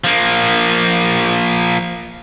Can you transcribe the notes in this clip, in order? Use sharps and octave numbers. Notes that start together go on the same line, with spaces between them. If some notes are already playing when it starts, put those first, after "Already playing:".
F3 A#3